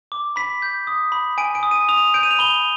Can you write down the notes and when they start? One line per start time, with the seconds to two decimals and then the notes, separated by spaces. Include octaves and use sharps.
0.12 D6
0.36 B5 B6
0.62 G6
0.87 D#6
1.12 B5
1.38 G#5 D7
1.55 D7
1.63 D#6
1.71 D#7
1.88 D#6 F7
2.14 G6 D7
2.23 D#7
2.31 F7
2.39 B5 G7